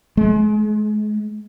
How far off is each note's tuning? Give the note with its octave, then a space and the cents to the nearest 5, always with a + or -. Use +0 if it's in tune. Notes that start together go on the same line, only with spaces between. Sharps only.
G#3 +35